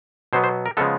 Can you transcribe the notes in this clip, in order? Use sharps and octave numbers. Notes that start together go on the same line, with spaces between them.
B2 F#3 B3 C5
C5
A#4
C#3 F3 G#3 B3 A4